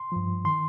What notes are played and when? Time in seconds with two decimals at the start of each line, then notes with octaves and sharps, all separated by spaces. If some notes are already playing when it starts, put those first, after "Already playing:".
Already playing: C6
0.12 G2 F3
0.45 D#3 C6